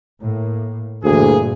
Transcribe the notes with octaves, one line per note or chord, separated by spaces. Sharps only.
A2 A#3
D2 G2 A#2 E3 A#3 G#4